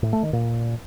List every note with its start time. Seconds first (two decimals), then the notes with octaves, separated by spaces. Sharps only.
0.03 A2
0.13 A3
0.23 D#3
0.33 A#2